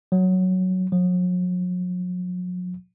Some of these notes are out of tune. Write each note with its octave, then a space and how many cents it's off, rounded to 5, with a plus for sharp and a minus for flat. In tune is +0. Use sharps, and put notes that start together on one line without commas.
F#3 +5
F#3 -40